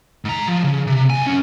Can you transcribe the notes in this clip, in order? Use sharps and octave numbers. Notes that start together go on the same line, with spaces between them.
G#2 A#5
F3
C#3
C3
B1 G#5
F#2 C#4